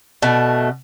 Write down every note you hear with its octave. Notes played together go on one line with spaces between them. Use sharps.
B2 A3